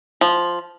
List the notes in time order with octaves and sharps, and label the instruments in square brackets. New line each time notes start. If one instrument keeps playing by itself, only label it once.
[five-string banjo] F3